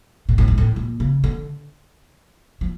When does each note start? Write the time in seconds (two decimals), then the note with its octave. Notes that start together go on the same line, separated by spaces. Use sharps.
0.29 A#2
0.38 A2
0.48 G#2
0.58 A2
0.76 A#2
1.00 C#3
1.24 D3
2.61 F3